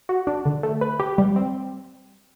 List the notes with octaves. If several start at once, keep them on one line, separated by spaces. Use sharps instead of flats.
F#4
D4
D3
A3
B4
G4
G3
C4